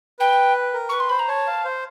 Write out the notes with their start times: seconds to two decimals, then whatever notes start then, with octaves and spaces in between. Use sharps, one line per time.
0.19 B4 G5
0.74 A#4
0.89 B4 C#6
1.00 C6
1.09 C5 B5
1.19 A#5
1.28 C#5 A5
1.47 F5
1.65 C5